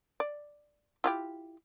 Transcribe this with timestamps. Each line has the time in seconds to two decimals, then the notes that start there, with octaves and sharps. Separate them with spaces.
0.20 D5
1.04 E4 F4 G4